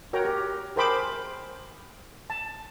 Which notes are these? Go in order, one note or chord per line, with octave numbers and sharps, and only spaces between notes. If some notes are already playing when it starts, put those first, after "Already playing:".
F#4 A#4 C#5 G5 A#5
G4
G#4 A#4 C5 G5 B5 D6
A5